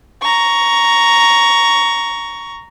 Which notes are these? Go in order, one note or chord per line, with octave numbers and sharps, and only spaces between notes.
A#5 C#6